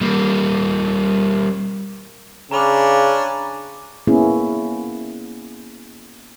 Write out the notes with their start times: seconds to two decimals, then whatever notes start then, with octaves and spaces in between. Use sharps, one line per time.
0.01 G3 A#3
2.51 C#3 C#4 D4 A#5 B5 D6
4.07 A#3 B3 C#4 E4 G#4